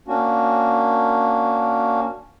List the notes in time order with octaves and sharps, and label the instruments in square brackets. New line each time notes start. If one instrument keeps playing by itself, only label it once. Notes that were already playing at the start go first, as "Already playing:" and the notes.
[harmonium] A#3 C#4 D4 F#4